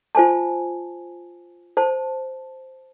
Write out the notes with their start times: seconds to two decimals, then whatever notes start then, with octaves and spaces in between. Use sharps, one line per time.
0.15 F4 C5 G#5 A5
1.77 C5 A5